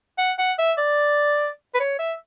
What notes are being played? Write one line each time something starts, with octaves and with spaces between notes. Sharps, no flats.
F#5
F#5
E5
D5
B4
C#5
E5